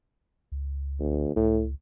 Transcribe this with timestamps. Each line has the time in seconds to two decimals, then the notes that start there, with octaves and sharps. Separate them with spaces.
0.52 C#2
1.00 D2
1.36 C#2 A2